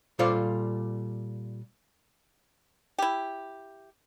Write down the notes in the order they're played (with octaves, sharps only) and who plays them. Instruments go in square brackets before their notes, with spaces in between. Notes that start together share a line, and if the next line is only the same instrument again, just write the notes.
[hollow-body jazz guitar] A#2 G3 F4 A4 C5 D5
[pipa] E4 G4